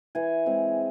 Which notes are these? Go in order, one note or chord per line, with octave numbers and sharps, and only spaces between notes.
E3 G#5
G#3 C4